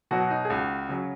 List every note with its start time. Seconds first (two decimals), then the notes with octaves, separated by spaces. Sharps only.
0.11 B2 F#3 F#4
0.30 D#4
0.45 G#4
0.50 C#2 F#4
0.89 C#3 F#3